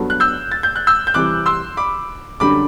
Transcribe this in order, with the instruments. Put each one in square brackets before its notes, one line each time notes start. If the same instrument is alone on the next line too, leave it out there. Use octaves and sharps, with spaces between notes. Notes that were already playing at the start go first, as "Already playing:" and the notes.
Already playing: [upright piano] G2 F#3 B3 F#4 A4
[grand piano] F#6
E6 G6
A6
G6
F#6
E6 G6
G6
[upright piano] C3 E3 G3 [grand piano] D6 F#6
[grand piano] C6 E6
B5 D6
[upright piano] F#2 D3 G3 D4 G4 [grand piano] B5 D6